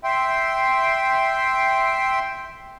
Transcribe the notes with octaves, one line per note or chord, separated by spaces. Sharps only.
E5 G5 C6